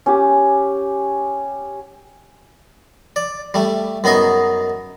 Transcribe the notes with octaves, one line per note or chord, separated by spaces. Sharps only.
C#4 G4
D5
G3 A3
F#2 B3 D#4 G#4 D#5 C#6